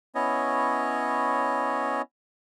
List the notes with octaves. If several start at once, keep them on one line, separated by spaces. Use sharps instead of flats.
B3 C#4 E4 C#5 D#5